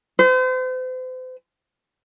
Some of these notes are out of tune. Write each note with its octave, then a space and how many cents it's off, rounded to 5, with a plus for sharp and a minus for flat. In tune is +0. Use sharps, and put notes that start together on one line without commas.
C5 -40